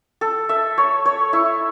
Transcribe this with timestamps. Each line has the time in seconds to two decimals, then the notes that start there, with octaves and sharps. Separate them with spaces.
0.21 A4
0.49 E5
0.78 C#5
1.05 C#5
1.33 E4